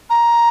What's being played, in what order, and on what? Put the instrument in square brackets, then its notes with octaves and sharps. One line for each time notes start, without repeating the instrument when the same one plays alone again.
[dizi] A#5